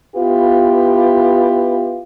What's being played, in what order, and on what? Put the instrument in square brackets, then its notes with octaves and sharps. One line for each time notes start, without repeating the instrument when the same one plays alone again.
[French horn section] B3 E4 F4 G4 B4